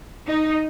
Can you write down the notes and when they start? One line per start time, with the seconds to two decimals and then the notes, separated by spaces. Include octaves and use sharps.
0.27 D#4